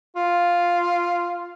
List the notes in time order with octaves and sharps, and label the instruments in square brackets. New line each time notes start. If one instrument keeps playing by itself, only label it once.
[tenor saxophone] F4